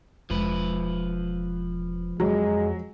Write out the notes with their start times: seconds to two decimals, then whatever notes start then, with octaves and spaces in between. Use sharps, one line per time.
0.30 E1 F3 G#3 B4
2.20 F2 F#3 G#3